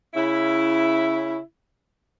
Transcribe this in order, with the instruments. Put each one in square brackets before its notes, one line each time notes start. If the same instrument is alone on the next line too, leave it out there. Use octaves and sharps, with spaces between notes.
[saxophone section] C#3 C#4 E4